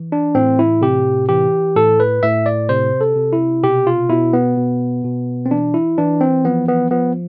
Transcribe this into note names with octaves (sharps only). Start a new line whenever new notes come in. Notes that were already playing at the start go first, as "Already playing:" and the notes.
Already playing: E3
D4
A2 C4
E4
C3 G4
E3 G4
A2 A4
B4
A2 E5
D5
C3 C5
A4
C3
E4
B2 G4
F4
B2 E4
B3
B2
B2
C4
E3 D4
E4
E3 D4
C4
F3 B3
B3
F3 B3